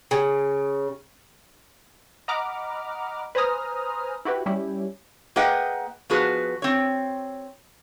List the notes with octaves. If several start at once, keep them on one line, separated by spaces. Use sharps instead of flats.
C#3
D#5 F#5 A#5 B5 D6 F6
B4 C5 G#5 A#5 D#6 F6
E4 F#4 G4 B4
G3 C#4 E4 G4
A#3 G#4 B4 D#5 F#5 G5
F3 B3 F#4 G#4 B4
C4 C#5